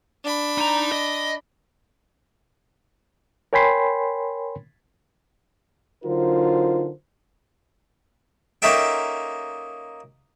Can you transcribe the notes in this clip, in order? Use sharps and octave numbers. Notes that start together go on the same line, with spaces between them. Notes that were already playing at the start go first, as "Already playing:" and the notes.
D4 B5
D#4 A#5
D#5
A#4 C#5 G5 G#5 B5 C6
D3 F#3 D#4 F4 A#4 C5
A#3 C#4 D#4 A4 E5 G5